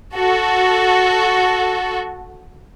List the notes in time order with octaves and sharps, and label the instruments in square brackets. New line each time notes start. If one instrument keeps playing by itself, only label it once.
[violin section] F#4 A4